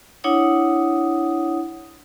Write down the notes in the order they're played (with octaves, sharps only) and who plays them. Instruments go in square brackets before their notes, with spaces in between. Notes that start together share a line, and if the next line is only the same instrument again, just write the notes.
[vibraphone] D4 E4 C#5 F#5 D#6